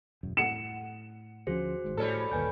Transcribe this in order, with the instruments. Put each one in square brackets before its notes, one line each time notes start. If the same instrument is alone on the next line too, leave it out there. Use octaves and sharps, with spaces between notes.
[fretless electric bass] E1 F#2
[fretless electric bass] A2 [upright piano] F#5 C#7 E7
[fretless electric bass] D2 F3 C#4 [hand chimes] F#4 G#4 C5
[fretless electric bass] G#1 G#2
[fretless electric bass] A2 [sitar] G3 C#4 A4
[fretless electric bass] G1 D#2 A#2 [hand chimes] B4 G#5 G6